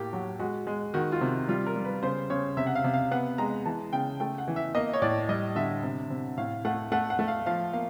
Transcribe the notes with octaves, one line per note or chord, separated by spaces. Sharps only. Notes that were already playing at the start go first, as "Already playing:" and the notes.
Already playing: A2 A#3 G4
F#3 F#4
G#3 F#4
G#3
D#3 F#4
F4
C3
G3 F4
A#4
G3
B4
C#3 C5
C#3 C#5
C3 E5
F#5
F5
C3
F5
B3 F#5
G#3 A#5
E3 A5
C#3 G5
A3 G5
F#5
E3
E5
A#3 D#5
C#5
A2 D5
G3 D#5
D3 E5
C3
C3
A2 F5
A3 F#5
A3 F#5
F#5
A3
F5
F3 F5
A#3 F5